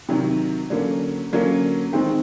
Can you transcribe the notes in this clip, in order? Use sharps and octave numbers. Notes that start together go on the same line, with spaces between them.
C3 D#3 F#3
D3 F#3 A#3 C#4
D3 F#3 A#3 C#4
D#3 G#3 C4